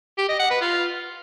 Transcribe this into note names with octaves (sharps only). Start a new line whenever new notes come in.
G4
D#5
F#5
B4
F4